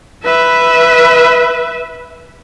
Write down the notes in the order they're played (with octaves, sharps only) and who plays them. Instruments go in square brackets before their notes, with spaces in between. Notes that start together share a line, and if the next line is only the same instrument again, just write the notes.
[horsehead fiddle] B4 E5